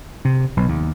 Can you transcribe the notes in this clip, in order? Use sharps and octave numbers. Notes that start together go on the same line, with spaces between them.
C3
B1
D#2